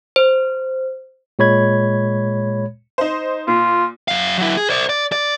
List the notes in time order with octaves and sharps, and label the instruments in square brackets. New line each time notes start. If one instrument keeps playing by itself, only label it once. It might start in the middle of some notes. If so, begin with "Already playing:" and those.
[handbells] C5
[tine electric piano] A#2 G#3 C#5 B5 G#6
[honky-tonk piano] D#4 C5
[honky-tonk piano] A#2 [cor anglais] F4
[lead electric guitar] F#2 F5
F#3 E4
G#4
C5 D5
D5
D5